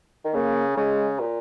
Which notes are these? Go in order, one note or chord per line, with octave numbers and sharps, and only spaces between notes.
D#3
C#3 A#3
C#3 G#3
A#2